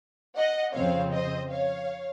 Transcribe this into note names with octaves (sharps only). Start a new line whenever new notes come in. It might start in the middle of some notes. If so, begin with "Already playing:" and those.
D#5 F#5
F2 C#3 F3 C4 C#5 F5
C5 D#5
C#5 F5